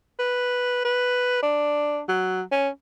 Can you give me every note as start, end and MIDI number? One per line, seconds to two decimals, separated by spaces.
0.19 0.83 71
0.85 1.40 71
1.42 2.00 62
2.09 2.42 54
2.52 2.69 61